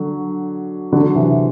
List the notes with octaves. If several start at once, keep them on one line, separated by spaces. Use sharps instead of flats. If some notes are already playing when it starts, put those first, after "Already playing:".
Already playing: D3 F#3
D3 F#3
C3 E3